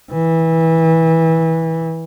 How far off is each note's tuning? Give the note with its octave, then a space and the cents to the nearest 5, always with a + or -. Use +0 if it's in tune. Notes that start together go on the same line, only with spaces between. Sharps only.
E3 -20